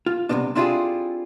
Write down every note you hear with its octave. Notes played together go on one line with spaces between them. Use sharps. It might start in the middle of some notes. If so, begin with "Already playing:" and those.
F4
C2 G#2 C3 B3 D4
C4 D4 E4 F4 G4 G#4